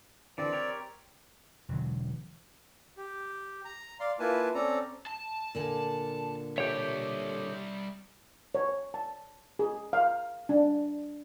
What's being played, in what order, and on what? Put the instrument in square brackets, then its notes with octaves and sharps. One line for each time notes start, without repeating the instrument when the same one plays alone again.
[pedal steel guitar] D3 E3 [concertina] C4 D5
[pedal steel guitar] G4 A#4 C#5
[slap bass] E1 D3 F#3
[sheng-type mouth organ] G4
A#5
D5 F5 C6
A#3 E4 F4 B4 G#5 A5
C4 C#4 A4 D5 A#5
[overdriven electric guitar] A5
[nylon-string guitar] A#2 D3 G#5
[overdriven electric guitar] G3 E5 [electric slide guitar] G4 A4 C#5
[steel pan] C#5
A5
G#4
F5
D4